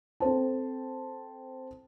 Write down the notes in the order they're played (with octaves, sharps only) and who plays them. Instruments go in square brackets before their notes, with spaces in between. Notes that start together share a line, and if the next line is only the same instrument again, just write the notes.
[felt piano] C4 A4 C5 A5